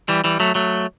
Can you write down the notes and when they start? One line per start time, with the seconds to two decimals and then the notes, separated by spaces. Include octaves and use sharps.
0.09 E3 G3
0.24 E3 G3
0.40 F#3 A3
0.55 F#3 A3